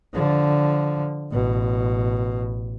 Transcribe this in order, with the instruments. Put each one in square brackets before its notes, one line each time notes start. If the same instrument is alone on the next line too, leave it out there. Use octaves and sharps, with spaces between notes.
[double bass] D3 F3
A1 B2